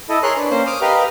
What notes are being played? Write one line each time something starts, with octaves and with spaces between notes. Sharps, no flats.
E4 A4 D#5
G#4 A#4 C#5 C6 F#6
D4 B4
A#3 C#4 C5
D6 D#6 F6
G4 A#4 B4 D#5 F5